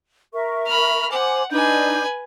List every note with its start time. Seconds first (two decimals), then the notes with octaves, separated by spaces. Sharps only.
0.34 A#4 E5 C#6
0.67 B5 F6
1.12 C5 F#5 G#5 D6
1.51 D4 D#4 B4 G#5 G6